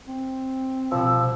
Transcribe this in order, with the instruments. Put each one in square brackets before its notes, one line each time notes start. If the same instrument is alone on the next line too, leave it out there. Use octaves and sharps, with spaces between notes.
[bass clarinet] C4
[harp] C2 B2 [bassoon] F3 [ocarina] E6